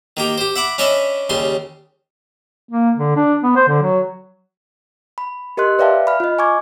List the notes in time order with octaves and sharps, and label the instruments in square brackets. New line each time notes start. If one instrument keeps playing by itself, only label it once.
[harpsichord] D#3 A#3 G4
G4 C5
E5 F#5 B5 D6
C#4 D4 C#5 D#5 E5 B5
D#2 C#3 G3 C6
[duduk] A#3
D3
D4
B3
C5
D3
F#3
[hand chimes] B5
G4 A#4 D#5 C6 F#6
B4 D5 E5 F5 G5 A5
B5 F6
F4 D#5
G#5 C#6 D6 G#6